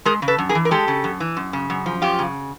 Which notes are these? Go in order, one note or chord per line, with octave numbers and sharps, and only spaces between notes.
G#3 G#4 A#4
C#3
A4 B4
F#2
G#4 A#4
E3
A#4
G#3 G4 A4
C#3
F#2
E3
F#2
C#3
F#2
F3
F#2 F4 G4
C#3